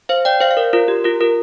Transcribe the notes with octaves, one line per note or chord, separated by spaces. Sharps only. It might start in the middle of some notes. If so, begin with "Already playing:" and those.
C5 F5
D5 G5
C5 F5
F5
A#4 D5
F4 A#4
G4
F4 A#4
F4 A#4